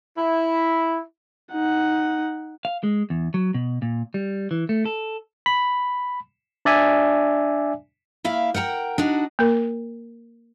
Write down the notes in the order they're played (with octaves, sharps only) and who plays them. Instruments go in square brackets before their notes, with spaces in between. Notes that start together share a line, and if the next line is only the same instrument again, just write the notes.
[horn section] E4
[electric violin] D#4 F#5
[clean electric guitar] F5
G#3
E2
F#3
B2
A#2
G3
E3
A3
A4
[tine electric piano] B5
D4 D5 E5 G#5
[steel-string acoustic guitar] A#3 E4 E5 F5
A#4 F#5 G5 A#5
D4 D#4 F#4
[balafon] A#3 A#4